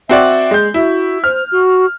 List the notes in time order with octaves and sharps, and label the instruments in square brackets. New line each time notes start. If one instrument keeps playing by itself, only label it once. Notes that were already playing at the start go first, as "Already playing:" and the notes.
[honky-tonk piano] C4 F#4 D5 [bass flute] E5
[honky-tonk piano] G#3 G6
[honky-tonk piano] E4 [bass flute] F#4
[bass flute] C5 [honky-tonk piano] F6
[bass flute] F#4